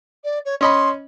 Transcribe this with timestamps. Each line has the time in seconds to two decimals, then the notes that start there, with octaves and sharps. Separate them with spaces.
0.24 D5
0.45 C#5
0.61 C#4 D#5 B5 C6